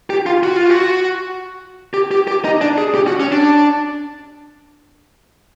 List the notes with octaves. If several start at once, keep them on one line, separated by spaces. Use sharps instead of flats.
G4
F4
F#4
F4
F#4
G4
G4
G4
D#4
D4
G#4
G4
F#4
C#4
D4